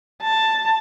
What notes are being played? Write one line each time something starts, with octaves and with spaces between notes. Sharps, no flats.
A5